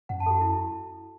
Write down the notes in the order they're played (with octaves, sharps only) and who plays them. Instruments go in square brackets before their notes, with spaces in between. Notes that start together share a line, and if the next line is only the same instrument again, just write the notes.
[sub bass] F#2 [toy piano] F#5
[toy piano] A5
A4
F#4
E4